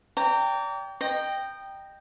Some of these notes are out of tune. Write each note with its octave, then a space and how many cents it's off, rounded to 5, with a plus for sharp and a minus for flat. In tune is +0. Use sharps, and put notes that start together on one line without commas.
D5 -40 G5 +0 A#5 -25
D#5 -20 G5 +0 A#5 +0